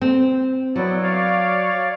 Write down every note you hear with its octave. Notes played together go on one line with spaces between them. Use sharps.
C4
F#3 B3 E4 D5
C#5 D5 F5